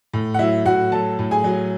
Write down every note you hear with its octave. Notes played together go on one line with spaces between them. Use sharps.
A2
F#5
F#3 E4 E5
A2 F#4 F#5
F#3 A4 A5
A2
G#4 G#5
F#3